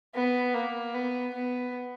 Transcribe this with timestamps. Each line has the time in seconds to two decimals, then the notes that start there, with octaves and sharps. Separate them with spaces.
0.15 B3
0.54 A#3
0.94 B3
1.33 B3